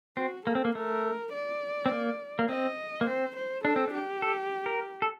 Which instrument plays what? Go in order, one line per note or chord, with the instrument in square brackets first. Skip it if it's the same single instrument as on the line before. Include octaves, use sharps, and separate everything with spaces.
[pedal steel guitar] C4 [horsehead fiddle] F#4
[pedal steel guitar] A#3 [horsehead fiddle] A4
[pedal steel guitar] C4
A#3
[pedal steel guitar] A3 [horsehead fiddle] A#4
[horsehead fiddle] D5
[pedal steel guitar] C4
A#3
A#3
[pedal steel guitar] C4 [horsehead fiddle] D#5
[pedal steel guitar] A#3
[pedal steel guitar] C4 [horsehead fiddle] C5
[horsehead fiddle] C5
[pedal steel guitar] D4 [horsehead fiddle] A4
[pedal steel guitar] C4
D4
[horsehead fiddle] G4
[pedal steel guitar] A4
A#4
A4